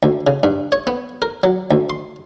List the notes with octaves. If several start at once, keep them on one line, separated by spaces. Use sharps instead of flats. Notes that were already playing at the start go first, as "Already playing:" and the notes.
D2
C#3
G2
C#5
B3
A#4
F#3
D2
C6